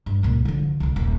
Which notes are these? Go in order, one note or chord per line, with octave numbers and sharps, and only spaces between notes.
G2
C#2 A#2
D3 F3
C2 F2
D#1